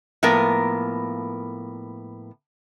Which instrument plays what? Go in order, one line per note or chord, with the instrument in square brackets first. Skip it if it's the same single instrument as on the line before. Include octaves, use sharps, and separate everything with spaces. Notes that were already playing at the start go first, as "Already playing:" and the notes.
[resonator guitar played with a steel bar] A2 F3 A#3 B3 A#4